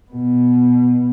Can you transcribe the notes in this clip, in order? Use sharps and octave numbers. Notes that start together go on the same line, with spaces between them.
B2 B3